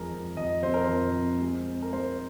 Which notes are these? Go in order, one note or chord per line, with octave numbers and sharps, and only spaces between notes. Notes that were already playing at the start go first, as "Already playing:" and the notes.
Already playing: F2 G#3 C4 G#4 A#4
F2
F2 D#5
C4 C5
A#4
F2 C5
C4
G#3
C4
A#4
G#3 C5